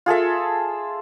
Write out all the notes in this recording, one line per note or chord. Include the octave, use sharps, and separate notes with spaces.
F4 G#4 A4 E5